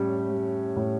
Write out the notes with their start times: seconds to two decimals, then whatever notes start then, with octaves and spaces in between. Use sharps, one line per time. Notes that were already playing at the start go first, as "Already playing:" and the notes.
Already playing: A2 G3 C#4
0.30 G3
0.76 A2